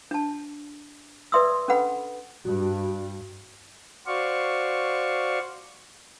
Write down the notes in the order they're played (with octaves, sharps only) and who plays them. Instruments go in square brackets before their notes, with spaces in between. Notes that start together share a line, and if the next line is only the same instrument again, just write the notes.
[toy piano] D4 A5
B4 D5 E5 C6 D#6 E6
C#4 D4 A4 B4 F#5 B5
[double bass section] G2 [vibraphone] F#4
[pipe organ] F#4 C5 D5 F5 C#6